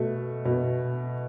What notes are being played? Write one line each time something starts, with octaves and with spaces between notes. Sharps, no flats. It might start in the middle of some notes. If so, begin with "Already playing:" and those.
Already playing: B2 A3
B2